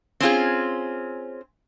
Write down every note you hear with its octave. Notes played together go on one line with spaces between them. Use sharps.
C4 C#4 F4 G#4